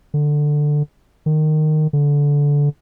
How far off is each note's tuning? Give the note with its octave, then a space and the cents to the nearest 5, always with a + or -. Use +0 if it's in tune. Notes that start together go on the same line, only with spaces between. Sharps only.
D3 +10
D#3 -15
D3 -20